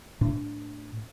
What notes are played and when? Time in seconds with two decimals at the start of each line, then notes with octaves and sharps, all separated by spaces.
0.21 A2 D4